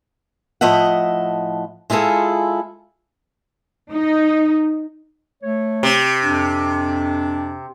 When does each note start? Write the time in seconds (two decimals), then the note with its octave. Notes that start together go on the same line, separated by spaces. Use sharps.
0.61 A2 F3 D#5 E5 F#5
1.90 G#3 E4 F4 G#4 A4
3.92 D#4
5.43 A3 C#5
5.83 C3
6.23 F2 D4